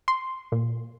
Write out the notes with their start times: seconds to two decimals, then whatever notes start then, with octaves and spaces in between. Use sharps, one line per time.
0.08 C6
0.52 A#2